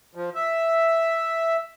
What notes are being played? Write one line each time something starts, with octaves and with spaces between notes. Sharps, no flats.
F3
E5